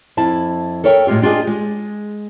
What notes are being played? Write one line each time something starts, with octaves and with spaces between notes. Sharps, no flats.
F2 E4 A5
A4 A#4 C#5 E5 F#5 G5
A2 G#3 C#4 F4 G4
D4 F4 G4 G#4 D#5
G#3